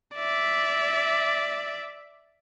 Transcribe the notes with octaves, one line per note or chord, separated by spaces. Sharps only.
D5 E5